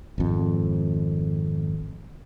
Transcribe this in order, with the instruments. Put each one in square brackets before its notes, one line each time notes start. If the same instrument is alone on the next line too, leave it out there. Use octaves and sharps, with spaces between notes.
[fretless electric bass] G#1 F2